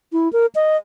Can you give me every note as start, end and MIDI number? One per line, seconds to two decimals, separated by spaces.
0.13 0.31 64
0.33 0.46 70
0.55 0.77 75